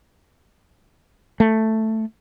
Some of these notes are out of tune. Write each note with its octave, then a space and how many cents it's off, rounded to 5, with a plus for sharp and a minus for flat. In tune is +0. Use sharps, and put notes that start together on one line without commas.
A3 +5